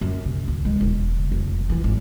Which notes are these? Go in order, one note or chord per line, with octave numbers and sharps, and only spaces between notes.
F#2
C3
D2
G#3
E1
C#3
F1
E3
G#1